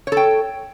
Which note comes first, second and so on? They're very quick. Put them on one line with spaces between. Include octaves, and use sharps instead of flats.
C#5 A4 G5